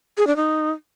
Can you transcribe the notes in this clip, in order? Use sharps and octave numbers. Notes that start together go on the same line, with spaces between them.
G#4
D4
D#4